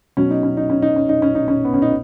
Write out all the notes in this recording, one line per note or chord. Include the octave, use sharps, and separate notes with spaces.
B2 F#3 C#4
D#4
C#4
D#4
C#4
D#4
C#4
D#4
C#4
D#4
C#4
B3
C#4
D#4